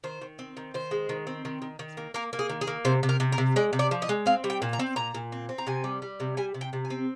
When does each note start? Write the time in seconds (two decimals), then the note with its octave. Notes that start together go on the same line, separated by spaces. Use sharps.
0.04 D#3 C5
0.21 D#3
0.39 C4
0.57 D#3
0.74 D#3 C5
0.91 G#3
1.09 D#3
1.27 C4
1.45 D#3
1.62 D#3
1.79 D#3
1.97 A#3
2.14 A#3 A#4
2.33 A#3
2.39 G#4
2.50 D#3
2.61 G#4
2.67 A#3
2.85 C3 C5
3.03 C3
3.09 A#4
3.20 C3
3.32 A#4
3.38 C3
3.56 G#3 D5
3.73 C3
3.79 D5
3.91 F3
4.02 D#5
4.09 G#3
4.26 C4 F5
4.44 G3
4.50 G5
4.62 A#2
4.73 A#5
4.79 C4
4.96 A#2 A#5
5.14 A#2
5.32 C4
5.49 C4
5.58 A#5
5.67 C3 G#5
5.84 G3
6.02 G3
6.20 C3
6.37 G3 G#5
6.54 C3
6.61 G5
6.73 C3
6.85 G#5
6.90 C4